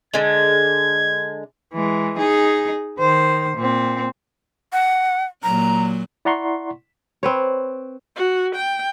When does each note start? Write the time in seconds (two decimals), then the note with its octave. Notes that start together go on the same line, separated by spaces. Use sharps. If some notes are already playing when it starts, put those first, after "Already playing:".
0.14 D3 G#3 G#6
1.74 E3 G#3
2.18 D#4 G#4
2.99 D#3 C5
3.57 A#2 C4
4.73 F#5
5.43 A#2 F#3 A#5
6.25 E4 D5 F#5 A#5 C6 C#6
7.23 C4 B4 C#5
8.16 F#4
8.55 G5